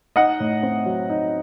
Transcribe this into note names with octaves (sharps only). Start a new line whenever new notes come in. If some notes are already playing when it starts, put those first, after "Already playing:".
D#4 D#5 F#5
A2
C4
F#3
D#4